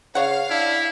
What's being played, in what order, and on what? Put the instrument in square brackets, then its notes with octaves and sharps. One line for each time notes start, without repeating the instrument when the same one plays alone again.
[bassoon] C#3 [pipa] C#5 F#5 [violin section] F5
[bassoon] D4 [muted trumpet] E4